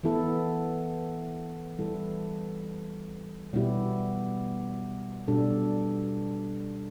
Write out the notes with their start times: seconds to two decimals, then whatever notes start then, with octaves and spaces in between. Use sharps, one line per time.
0.04 E3 B3 E4 A4
1.79 E3 G3 E4 A4
3.53 B2 G3 B3 E4 G4
5.28 B2 G3 D4 A4